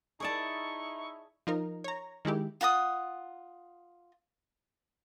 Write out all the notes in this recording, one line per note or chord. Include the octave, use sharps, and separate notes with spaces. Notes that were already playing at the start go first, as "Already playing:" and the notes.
D#4 E4 G#4 D5 E5 A5 C#6
F3 D#4 A#4
C#5 A#5
D#3 G#3 E4 G4
F4 F#5 A#5 D#6